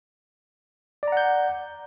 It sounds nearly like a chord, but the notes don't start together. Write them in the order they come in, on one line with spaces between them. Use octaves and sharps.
D5 A#5 F#5 G6